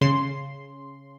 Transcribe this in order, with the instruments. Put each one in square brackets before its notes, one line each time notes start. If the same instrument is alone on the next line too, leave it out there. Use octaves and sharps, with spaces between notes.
[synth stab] C#3 C6